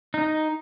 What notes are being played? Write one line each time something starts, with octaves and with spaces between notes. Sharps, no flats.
D#4